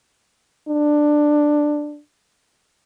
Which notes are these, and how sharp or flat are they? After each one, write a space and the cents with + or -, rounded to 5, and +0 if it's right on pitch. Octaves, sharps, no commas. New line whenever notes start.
D4 +10